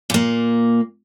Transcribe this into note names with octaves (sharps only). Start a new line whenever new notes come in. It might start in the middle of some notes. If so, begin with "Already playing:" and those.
A#2 A#3